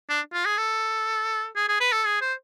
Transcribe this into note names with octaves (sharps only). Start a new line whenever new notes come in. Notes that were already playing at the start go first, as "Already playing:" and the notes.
D4
F4
G#4
A4
G#4
G#4
B4
A4
G#4
C5